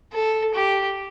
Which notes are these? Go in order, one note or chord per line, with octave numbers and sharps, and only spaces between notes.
A4
G4